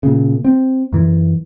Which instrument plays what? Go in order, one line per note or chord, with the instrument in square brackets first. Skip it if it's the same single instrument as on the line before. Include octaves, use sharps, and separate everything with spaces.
[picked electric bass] A#2 C#3
C4
F#2 E3